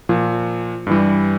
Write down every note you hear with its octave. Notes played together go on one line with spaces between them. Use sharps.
A#2 F3
G2 E3 G3